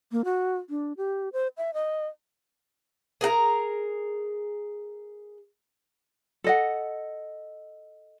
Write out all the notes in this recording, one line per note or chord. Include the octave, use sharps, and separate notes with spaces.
A#3
F#4
D4
G4
C5
E5
D#5
G#4 A#4 F#5 A#5
A4 D#5 F#5